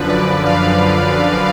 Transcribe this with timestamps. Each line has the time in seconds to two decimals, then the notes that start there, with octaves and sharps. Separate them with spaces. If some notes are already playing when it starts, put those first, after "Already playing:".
Already playing: F#2 D3 F3 B4
0.09 D5
0.46 F5